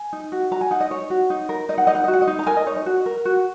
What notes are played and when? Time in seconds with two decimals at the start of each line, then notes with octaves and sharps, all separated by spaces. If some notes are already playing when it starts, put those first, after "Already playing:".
Already playing: G#5
0.13 D#4
0.32 F#4
0.51 F#4 A#5
0.61 G#5
0.71 D#4 F#5
0.80 D#5
0.90 D#4 C#5
1.10 F#4
1.30 D#4
1.49 A#4
1.69 D#4 D#5
1.78 F#5
1.87 D#4 D#5
1.95 F#5
2.04 D#5
2.08 F#4
2.13 F#5
2.22 D#5
2.27 D#4
2.39 A#5
2.47 A#4 G#5
2.57 D#5
2.66 D#4 C#5
2.76 D#5
2.86 F#4 F#5
3.06 A#4
3.25 F#4